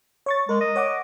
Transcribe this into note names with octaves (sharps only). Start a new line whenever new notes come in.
C#5 C#6 A6
G#3 A#4
D#5
C#5 F#5 D6